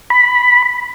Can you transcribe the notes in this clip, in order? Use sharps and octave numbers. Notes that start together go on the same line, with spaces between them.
B5